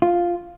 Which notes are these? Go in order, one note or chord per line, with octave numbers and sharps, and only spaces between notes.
F4